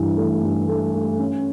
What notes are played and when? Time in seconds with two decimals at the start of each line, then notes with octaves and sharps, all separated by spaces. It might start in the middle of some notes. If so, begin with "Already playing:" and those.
Already playing: G2 E3
0.17 A3
0.43 G2
0.68 A3
0.95 A3
1.19 C#4